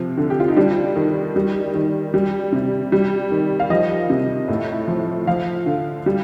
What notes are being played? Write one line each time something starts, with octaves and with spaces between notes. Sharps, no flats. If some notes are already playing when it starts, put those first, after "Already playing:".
Already playing: C3 F3
D3
G4
F4
D#4
G3 D4
D#3
G3
D#3
G3
C3
G3
D#3
F5
F3 D#5
C3
A2
F3
F3 F5
D3
G3